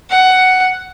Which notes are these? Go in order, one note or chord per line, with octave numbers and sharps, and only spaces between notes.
F#5